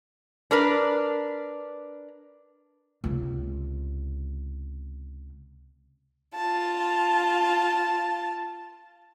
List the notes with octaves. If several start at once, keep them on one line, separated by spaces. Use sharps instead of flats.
D4 A#4 B4
C#2 C3
F4 A5